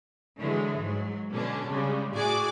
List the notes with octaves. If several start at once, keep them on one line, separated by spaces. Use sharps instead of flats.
D3 E3 F#3 G#3
G#2 F#3
B2 D3 C#4 D4
C#3 G3 G#3
A2 F#4 G#4 D5 G#5 D6